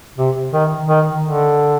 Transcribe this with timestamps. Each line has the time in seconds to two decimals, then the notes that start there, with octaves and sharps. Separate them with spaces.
0.18 C3
0.53 D#3
0.89 D#3
1.25 D3